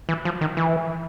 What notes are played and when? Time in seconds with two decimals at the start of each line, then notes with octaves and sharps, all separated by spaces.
0.09 E3
0.25 F3
0.41 D#3
0.57 E3